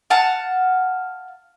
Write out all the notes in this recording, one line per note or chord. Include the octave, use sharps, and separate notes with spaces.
F5 F#5 A5